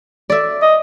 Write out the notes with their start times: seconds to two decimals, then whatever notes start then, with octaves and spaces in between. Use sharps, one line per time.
0.30 D5 E5
0.62 D#5